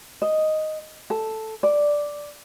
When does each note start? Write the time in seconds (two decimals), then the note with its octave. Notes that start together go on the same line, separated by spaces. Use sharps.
0.22 D#5
1.10 A4
1.63 D5